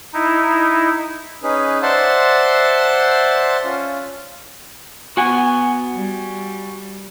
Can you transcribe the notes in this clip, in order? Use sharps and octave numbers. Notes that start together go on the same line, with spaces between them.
D#4 E4
C#4 D#4 G#4 B4
C5 D5 E5 F#5 A5 C6
C#4 F4
B3 F#4 F#5 G#5
G3